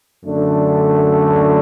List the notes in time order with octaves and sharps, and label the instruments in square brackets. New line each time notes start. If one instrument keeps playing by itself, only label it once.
[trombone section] F#2 D3 A3 D4